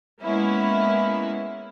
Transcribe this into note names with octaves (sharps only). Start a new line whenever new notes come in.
G#3 A#3 B3 C#4 E4